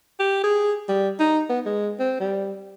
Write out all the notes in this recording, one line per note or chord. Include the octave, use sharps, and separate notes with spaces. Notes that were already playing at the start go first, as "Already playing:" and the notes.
G4
G#4
G3
D#4
B3
G#3
C4
G3